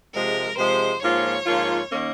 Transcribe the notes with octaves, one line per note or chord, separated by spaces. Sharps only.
C3 F3 G#3 A#4
C3 F3 G#3 C5
G#2 F3 A#3 F4 C#5
G#2 F3 A#3 F4
D#3 A#3 C#4